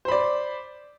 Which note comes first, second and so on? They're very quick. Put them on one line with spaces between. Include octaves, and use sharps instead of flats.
C5 B5 D5